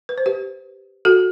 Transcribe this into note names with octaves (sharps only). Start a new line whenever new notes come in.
B4
C5
G4 B4
F#4 A4